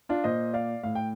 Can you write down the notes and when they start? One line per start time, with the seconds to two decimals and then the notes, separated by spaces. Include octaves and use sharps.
0.09 D4 F4
0.24 A#2 C5 D#5
0.54 D5 F5
0.83 A2 F5
0.95 G5